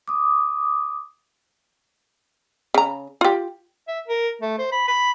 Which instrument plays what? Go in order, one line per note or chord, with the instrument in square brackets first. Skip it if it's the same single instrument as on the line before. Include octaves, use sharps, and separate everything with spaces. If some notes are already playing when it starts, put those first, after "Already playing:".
[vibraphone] D6 D#6
[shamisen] C#3 A#5
F4 G4
[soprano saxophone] E5
A#4
A3
C5
B5
B5